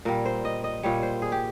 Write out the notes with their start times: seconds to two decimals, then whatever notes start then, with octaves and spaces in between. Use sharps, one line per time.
0.05 A#2 G3 A#4
0.25 C5
0.45 D#5
0.64 D#5
0.83 A#2 G3 C#5
1.03 C5
1.22 G#4
1.32 G4